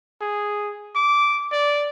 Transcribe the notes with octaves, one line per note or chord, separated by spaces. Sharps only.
G#4
D6
D5